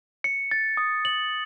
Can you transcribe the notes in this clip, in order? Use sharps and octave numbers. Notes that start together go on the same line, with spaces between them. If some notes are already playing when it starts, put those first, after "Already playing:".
C#7
A6
D#6
F#7